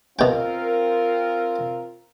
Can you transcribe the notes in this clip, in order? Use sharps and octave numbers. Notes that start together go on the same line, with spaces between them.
B2 C4 F4 A#4 G5